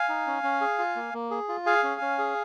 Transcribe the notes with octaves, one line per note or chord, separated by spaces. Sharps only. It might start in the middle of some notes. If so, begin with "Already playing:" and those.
Already playing: F5 G#5
D#4
C#4
C#4
G#4
F4
A#3
A#3
G#4
F4
G#4 F5 G#5
C#4
C#4
G#4